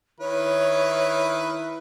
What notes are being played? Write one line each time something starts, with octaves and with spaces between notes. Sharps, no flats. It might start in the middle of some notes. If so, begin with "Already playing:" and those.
D#3 E4 B4 C#5